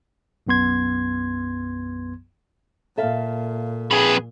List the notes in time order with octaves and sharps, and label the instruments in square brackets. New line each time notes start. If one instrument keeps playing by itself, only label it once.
[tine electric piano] B1 F#2 B3 C6 G#6
[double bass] A#2 [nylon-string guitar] A4 E5 F5
[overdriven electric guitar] F2 B4 [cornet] G#4